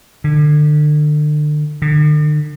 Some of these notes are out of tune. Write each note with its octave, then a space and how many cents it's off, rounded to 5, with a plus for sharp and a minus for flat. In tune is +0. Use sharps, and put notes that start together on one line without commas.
D3 +35
D3 +45